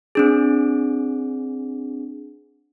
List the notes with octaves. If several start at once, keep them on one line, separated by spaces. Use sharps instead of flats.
C4 D4 G#4